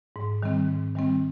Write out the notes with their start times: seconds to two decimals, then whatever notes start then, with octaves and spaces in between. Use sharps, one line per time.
0.16 G#2
0.43 D#3 G3 C4
0.68 G#2
0.95 D#3 G3 C4